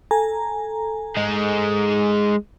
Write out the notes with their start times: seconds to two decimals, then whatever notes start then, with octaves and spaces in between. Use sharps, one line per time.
0.11 A4 G#5 A#5
1.17 G#3 D#4